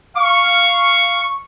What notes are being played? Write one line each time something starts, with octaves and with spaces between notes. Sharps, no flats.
F5 C#6